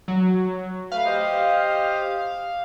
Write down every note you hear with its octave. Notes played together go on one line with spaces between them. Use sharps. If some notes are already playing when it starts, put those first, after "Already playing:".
F#3
A3 B4 F5 B5
G4 C5 D#5